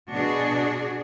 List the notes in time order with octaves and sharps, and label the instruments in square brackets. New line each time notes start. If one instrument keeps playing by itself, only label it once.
[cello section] B2 D4 F#4 G#4